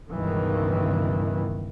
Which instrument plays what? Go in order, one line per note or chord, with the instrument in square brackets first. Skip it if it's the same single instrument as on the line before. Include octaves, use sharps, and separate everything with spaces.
[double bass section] C#2 G2 B2 D#3 E3